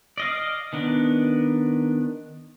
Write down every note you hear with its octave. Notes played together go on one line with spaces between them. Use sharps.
D5 D#5 F5
D#3 B3 D4